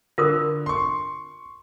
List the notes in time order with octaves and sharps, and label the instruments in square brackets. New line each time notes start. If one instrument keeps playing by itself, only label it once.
[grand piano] D3 [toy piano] F4 A#4 D#6
[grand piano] C6 C#6